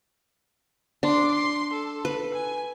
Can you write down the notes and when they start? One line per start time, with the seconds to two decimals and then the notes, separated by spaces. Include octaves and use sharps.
1.03 D4 C6 D6
1.31 C6
1.73 A4
2.05 B4
2.35 G#5